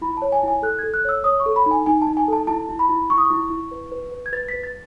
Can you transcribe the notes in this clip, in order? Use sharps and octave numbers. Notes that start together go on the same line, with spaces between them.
E4 B5
C#5 A5
G#5
E4 G#5
A4 F#6
A4 G#6
F#6
C#5 E6
C#5 D#6
C#6
A4
B5
D#4
G#5
D#4 G#5
A5
D#4
G#5
A4 A5
E4 A5
E4
B5
E4
E4 C#6
D#6
C#6
E4
E4
B4
B4
B4
G#6
B4 A6
B4 B6
A6